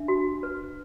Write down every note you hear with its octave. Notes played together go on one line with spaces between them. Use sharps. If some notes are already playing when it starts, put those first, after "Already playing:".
Already playing: D4 E5
F#4
B4